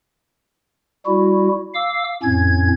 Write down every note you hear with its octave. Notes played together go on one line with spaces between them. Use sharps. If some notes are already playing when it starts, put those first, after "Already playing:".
G3 E4 F#4
F5 D6 E6
F2 A2 C#4 G#6